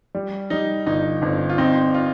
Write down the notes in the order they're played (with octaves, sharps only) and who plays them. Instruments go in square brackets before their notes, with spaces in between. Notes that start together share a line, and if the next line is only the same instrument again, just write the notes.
[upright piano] G3
[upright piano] G3 [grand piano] D#4
[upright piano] G1 [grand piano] D#4
[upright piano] G1 [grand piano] C4
[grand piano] F4
[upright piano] C4 [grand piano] D#4
[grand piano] F4